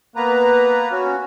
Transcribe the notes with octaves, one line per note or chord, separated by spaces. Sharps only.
A#3 B3 B4 A#5
C#4 F#4